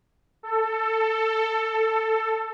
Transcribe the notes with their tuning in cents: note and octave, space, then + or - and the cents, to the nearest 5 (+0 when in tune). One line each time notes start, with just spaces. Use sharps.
A4 +15